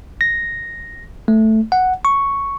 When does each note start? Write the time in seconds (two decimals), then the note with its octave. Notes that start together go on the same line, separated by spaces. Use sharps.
0.21 A#6
1.28 A3
1.72 F#5
2.05 C#6